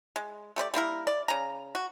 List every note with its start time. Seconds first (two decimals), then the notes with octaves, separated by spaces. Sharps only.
0.16 G#3
0.56 A3 G4 C5 D5
0.74 G3 A#3 E4 A#4
1.07 D5
1.28 C#3 A#5
1.75 F#4